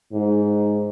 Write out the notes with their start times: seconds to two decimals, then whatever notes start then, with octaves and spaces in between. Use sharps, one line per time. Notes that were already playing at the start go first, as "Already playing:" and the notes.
0.13 G#2